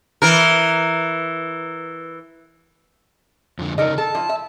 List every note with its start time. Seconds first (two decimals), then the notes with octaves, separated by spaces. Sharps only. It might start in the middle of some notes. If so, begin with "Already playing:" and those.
0.22 E3 A#4
3.59 F2 D3
3.78 C#3 D#4 A4 A#4 D#5
3.98 A4 A5
4.15 F3 E4
4.29 E5